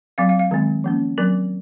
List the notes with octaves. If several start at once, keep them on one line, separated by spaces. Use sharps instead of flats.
F#3 C4 F5
F5
F5
D#3 G#3 C4
F3 A#3 C#4
F#3 C4 A#4